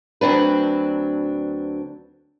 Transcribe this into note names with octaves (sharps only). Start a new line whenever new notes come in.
D2 F#3 C4 D4 B4